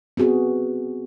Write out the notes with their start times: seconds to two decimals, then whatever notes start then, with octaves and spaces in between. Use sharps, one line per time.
0.17 B3 C4 F#4 G#4